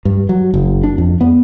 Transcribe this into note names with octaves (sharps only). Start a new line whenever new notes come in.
G2
F#3
F#1
D4
F2
B3